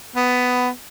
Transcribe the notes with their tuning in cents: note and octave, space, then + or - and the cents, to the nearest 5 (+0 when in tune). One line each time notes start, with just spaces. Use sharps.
B3 +10